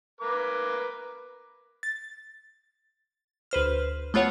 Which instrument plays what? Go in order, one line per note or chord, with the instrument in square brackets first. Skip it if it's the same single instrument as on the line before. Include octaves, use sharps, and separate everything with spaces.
[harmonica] A#4 B4 D6
[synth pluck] A6
D2 B4 C5 F6
A3 B3 F4 C#5 F#5